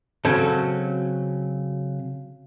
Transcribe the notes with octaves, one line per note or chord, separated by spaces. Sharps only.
C#3 F#3 C4 C#4 A4